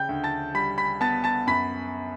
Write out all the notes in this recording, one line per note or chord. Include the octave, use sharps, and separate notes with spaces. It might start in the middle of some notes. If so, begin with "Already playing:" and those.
Already playing: C#3 G5 G6
D2
A5 A6
G3 B5 B6
B5 B6
B3 A5 A6
A5 A6
F#2 B5 B6